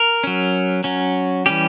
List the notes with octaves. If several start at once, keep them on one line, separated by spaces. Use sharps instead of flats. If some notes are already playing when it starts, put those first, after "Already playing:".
Already playing: A#4
F#3 C#4
F#3 C#4
E3 G3 C#4 G4